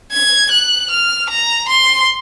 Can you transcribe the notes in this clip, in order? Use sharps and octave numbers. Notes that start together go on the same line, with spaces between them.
G#6
F#6
F6
A#5
C6